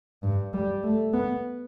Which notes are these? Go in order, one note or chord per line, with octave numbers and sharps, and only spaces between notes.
G2
G3
A3
B3